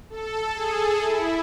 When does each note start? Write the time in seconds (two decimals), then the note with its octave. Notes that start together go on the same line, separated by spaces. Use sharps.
0.10 A4
0.54 G#4
1.00 E4